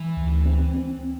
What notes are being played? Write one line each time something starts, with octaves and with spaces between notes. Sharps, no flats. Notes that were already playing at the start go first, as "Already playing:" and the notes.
Already playing: E3
D2
C4
C4